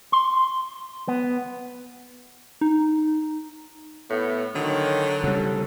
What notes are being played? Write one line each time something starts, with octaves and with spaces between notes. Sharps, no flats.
C6
B3
D#4
A2 B3
D3 D#3 F#3
C#3 G3 A4